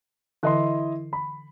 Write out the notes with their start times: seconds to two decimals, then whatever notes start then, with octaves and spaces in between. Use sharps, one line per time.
0.43 D3 E3 E4 D#5 C6
1.13 B5